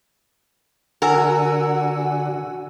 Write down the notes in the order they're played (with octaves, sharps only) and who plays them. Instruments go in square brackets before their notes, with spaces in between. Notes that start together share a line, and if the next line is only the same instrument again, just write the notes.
[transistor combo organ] D3 F#4 [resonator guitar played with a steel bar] A#4 [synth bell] F#5 G#5 E6